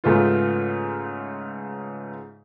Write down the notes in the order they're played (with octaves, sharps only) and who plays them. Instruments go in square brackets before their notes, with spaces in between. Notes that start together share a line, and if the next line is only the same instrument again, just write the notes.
[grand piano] G#2 C#3 A3 B3 F4